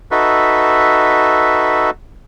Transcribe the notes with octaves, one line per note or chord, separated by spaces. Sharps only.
D#4 F#4 A4 B4 E5